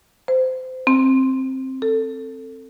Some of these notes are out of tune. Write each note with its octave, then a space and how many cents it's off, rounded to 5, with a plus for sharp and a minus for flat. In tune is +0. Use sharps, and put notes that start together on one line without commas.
C5 -25
C4 +10
A4 +20